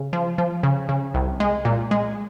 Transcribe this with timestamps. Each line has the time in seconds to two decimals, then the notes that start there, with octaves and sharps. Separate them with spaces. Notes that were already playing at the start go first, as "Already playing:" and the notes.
Already playing: C#3
0.13 F3
0.38 F3
0.63 C#3
0.89 C#3
1.14 C2
1.40 G#3
1.65 A#2
1.91 G#3